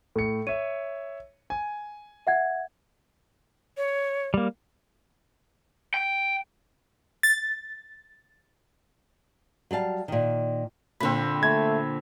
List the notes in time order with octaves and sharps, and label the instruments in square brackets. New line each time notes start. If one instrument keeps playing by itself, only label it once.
[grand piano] A2 C#7 [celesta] A4
[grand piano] C#5 E5 [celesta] D#7
[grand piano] G#5
[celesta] E5 F#5 G#6
[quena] C#5
[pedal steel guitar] G3 A#3
[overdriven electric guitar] G5
[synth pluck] A6
[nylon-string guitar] F#3 G3 F5 A5
A#2 D#3
[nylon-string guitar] A#2 D3 [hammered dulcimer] C4 B5
[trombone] A3 [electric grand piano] G#6